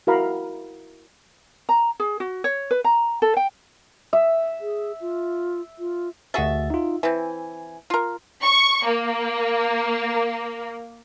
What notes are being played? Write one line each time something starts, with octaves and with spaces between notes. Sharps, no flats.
E4 F#4 A#4 F5 A#5 B5
A#5
G#4
F#4
C#5
B4
A#5
A4
G5
E5
G#4
F4
F4
D2 F#4 G#4 E5 A6
D#4 F4
E3 C4 G#5
F4 A#4
C#6
A#3